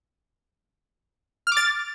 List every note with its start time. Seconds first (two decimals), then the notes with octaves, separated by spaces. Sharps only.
1.47 F6
1.52 D6
1.57 A6